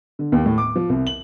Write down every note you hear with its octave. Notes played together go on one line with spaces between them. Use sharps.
D3
D#2
A2
D6
F3
C2
F#7